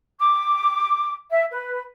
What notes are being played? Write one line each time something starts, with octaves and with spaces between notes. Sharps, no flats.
D6
E5
B4